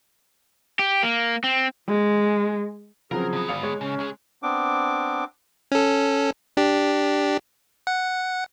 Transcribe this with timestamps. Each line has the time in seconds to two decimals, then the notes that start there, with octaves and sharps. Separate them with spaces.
0.79 G4
1.03 A#3
1.44 C4
1.87 G#3
3.11 C#3 F3 F#3 C4 G#4 A#4
3.33 D3 B3
3.49 G#1 F5 C#7 F7
3.63 G#3 G#4 C#5
3.81 C#3 C#4
3.99 C#2 G#4
4.43 B3 C4 D4 D6
5.72 C#4 A4
6.57 D4 G4
7.87 F#5